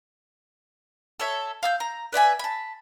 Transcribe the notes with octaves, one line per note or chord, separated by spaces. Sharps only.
A4 C#5 E5
F5 E6 G6
A#5
B4 D5 E5 G#5
A5 B5